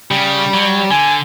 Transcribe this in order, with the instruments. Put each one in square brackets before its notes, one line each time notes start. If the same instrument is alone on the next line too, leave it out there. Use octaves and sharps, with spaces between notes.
[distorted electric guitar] C#3 [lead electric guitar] G3
[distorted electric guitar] F#3
[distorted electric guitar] D3 [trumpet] G#5